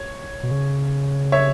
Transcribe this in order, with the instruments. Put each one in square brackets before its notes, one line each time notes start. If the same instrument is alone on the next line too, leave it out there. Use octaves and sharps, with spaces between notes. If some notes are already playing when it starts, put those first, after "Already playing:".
Already playing: [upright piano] C#5
[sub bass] B2
C#3
[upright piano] C#5 E5